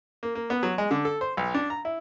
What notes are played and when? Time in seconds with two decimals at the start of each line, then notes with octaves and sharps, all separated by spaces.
0.23 A#3
0.35 A#3
0.50 B3
0.63 F#3
0.78 G#3
0.91 D3
1.05 A4
1.21 C5
1.37 B1
1.54 D4
1.70 A#5
1.85 E4